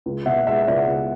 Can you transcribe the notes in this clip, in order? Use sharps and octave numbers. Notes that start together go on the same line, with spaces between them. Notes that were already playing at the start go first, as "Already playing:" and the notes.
C#2
B2 E5 F#5
G#3 E5 F#5
C#2 D5 E5
C#2